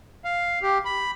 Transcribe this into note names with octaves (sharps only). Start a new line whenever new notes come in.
F5
G4
B5